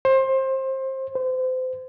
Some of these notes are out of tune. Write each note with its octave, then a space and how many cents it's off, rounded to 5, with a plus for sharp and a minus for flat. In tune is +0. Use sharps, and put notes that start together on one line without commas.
C5 +25
C5 -30